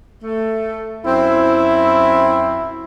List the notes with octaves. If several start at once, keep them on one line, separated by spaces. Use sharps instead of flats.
A3
F#2 C4 E4